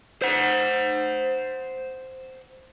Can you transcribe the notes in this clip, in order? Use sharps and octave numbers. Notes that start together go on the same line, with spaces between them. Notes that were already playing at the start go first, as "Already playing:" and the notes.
C5 F#5